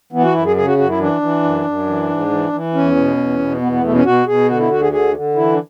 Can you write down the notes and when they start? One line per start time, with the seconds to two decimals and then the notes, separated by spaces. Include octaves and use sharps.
0.12 E3 B3
0.23 F#4
0.34 F#2 E4
0.46 G#4
0.56 C#3 G#4
0.67 F#4
0.78 F#2 F#4
0.89 E4
0.99 E3 D4
1.21 E3
1.43 F#2
1.65 F#2
1.87 E3
2.09 G#2
2.30 E3
2.53 E3
2.74 E2 C#4
2.96 B2
3.17 E2
3.39 B2
3.61 E2 B3
3.72 B3
3.83 B2 A3
3.94 C#4
4.05 B2 F#4
4.27 B2 G#4
4.48 D3 F#4
4.59 E4
4.70 D2 F#4
4.81 G#4
4.92 D3 G#4
5.14 D3
5.36 E3 E4
5.53 D4